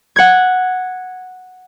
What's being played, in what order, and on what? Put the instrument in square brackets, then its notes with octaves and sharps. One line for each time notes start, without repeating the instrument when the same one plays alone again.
[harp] F#5 G#6